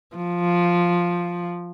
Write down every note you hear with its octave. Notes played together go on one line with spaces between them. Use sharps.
F3